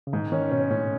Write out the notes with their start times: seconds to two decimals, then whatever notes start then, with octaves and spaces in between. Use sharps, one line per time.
0.07 C#3
0.13 G#2 D#3
0.32 D#3 C#4
0.51 B2 C#4
0.71 A2 C#4